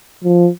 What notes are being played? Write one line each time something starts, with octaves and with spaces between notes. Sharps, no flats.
F3